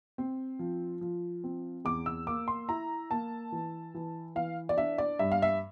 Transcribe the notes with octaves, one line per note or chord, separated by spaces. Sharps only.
C4
F3
F3
C4
E2 D6
E6
A#3 D6
C6
E4 A#5
A#3 A5
E3
E3
E3 F5
D5
D4 E5
D5
G2 E5
F5
E5